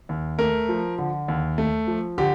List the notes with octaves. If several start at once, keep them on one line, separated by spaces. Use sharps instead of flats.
D#2
A3 A#4
F3
D3
D#2
A3
F3
D3 G4